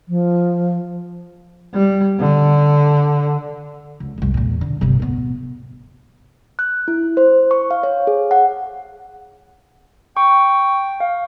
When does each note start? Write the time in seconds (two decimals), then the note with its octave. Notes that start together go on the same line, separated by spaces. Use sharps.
0.08 F3
1.73 G3
2.18 D3
4.00 C#2
4.18 F1 C2
4.34 E2 A#2
4.61 D3
4.81 G1 C3
5.00 D1 B3
6.59 F#6
6.88 E4
7.17 C5
7.51 C#6
7.71 F5
7.83 C#5
8.07 G#4
8.31 F#5
10.17 G5 C#6
11.00 F5